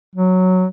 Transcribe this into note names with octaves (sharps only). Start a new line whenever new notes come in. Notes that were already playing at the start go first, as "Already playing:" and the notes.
F#3